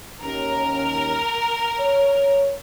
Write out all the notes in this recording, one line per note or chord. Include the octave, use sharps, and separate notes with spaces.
D#2 C#4 A#4
C#5